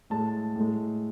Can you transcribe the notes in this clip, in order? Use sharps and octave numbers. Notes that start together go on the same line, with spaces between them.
A2 G#3 A5
A2 G#3